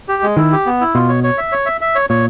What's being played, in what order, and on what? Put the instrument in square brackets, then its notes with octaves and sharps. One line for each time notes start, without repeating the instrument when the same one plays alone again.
[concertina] G4
G#3
[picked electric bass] D#3 [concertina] E4
[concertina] G4
B3
E4
[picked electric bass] B2 [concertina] F4
[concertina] C#5
C#5
E5
C#5
E5
E5
C#5
[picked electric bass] A#2 [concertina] C#5